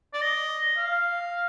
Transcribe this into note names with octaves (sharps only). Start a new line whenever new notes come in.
D5
D#5
F5